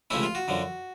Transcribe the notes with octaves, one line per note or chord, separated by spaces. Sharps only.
C#2 C3 F3 A3 C#4 E4
F4
F#4
F#2 D3 F3